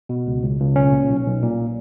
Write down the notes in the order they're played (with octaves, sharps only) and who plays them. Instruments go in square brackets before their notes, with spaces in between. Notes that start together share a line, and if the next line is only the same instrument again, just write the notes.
[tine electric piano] B2
C#2
C#2
C#2
B1 C#4
A#2
B1
B1
A#2